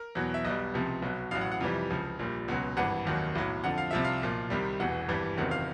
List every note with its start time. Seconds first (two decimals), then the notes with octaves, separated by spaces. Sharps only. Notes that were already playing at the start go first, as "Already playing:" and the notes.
Already playing: A#4
0.15 E2 B2 F#3
0.34 E5
0.44 B1 B2 G3 D#5
0.74 C#2 C3 F3
1.02 B1 B2 F#3
1.31 A1 A2 F#3 F5
1.41 F#5
1.52 F#5
1.61 F2 C3 E3 G3
1.90 C#2 C#3 F3
2.19 A#1 A#2 G3
2.48 C#2 B2 F#3
2.77 G#1 G2 E3 F#5
3.05 F1 D#2 D#3 F#3
3.35 B1 A2 F#3
3.64 F2 D3 F3 F#5
3.78 F5
3.91 C2 C3 F3 E5
4.05 F5
4.22 B1 A#2 F3
4.50 C2 C3 D#3 G3
4.80 E1 E2 B2 F#5
5.08 G#1 G2 E3 G3
5.37 F#1 E2 C3 D#3 F#3 F#5
5.51 F5